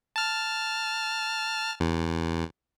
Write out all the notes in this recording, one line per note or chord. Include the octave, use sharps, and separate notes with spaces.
A5 F6
E2